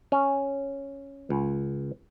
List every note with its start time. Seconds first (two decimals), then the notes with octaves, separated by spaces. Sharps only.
0.12 C#4
1.30 C#2